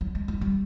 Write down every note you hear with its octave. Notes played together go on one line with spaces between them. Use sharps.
F#3
G#3
G#3
G3